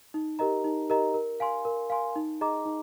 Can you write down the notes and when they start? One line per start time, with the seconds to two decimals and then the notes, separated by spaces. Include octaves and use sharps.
0.14 D#4
0.39 G4 A#4 D#5 A#5
0.64 D#4
0.90 G4 A#4 D#5 A#5
1.14 A#4
1.40 F5 G#5 C6
1.65 A#4
1.90 F5 G#5 C6
2.16 D#4
2.41 G#4 D#5 A#5 D6
2.66 D#4